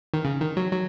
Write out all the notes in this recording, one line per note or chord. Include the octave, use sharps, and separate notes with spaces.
D#3
C#3
D#3
F#3
F#3